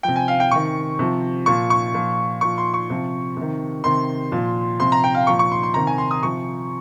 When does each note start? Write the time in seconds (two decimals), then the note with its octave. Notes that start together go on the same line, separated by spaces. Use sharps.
0.03 C3 F3 G5
0.16 G#5
0.28 F5
0.40 G5
0.51 C3 D#3 C#6
0.99 C3 F3
1.46 A#2 F3 C#6
1.70 C#6
1.94 A#2 F3
2.41 A#2 F3 C#6
2.58 C6
2.74 C#6
2.90 C3 F3
3.37 C3 D#3
3.84 C3 D#3 C6
4.32 A#2 F3
4.80 C3 F3 C6
4.92 A#5
5.04 G5
5.15 F5
5.27 A#2 F3 C#6
5.39 C#6
5.52 C6
5.63 C6
5.74 C3 D#3 A#5
5.87 G#5
5.98 C6
6.11 D#6
6.23 C3 F3 C#6